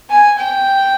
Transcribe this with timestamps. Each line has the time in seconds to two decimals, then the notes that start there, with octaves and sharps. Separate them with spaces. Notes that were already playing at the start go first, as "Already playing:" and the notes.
0.10 G#5
0.39 G5